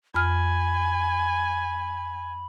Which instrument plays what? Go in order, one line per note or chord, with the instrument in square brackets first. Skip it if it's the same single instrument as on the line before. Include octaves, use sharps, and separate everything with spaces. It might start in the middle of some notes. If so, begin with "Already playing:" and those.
[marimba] F2 F6 [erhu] G#5 [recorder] B5